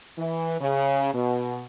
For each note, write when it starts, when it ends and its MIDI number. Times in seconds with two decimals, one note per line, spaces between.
0.17 0.58 52
0.59 1.12 49
1.13 1.63 47